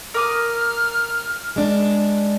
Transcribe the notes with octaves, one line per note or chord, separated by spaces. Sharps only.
A#4 D6 D#6 F6
G#3 D4